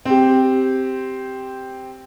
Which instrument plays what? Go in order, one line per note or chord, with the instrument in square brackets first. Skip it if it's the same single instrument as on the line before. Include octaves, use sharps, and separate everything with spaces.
[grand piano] C4 G4